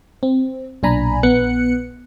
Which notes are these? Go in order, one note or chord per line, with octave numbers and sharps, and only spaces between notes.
C4
B1 A#2 D4 G#5 A#5 B5
A#1 B3 F#6 C#7